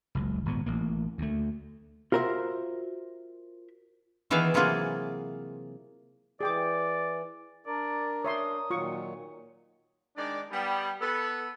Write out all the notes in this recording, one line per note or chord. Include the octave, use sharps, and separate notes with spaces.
F#1 C#2
G#1 A#2 B3
A1 A#3
D2 A3
F4 F#4 A#4 C5 E5
D#3 E3 B3 G#4 E5 F5
C3 E3 F#3 A#3 F4 G#4
E3 G#4 D5 G5 D6
D4 A#4 D5
C#5 E5 C6 D#6
A#2 D#3 F#3 F4 C#6
D#3 G#3 D4 D5
G3 B3
B3 A4 B4